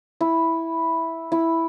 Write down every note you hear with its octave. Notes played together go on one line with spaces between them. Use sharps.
E4
E4